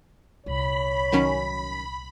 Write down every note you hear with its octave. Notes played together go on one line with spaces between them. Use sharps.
C2 A#2 C#5 B5
D#3 F#3 C#4